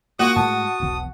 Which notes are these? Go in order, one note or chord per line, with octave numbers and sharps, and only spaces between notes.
A#2 F#4 D#6
A2 G#3 A5 D#6
E1 B1 E3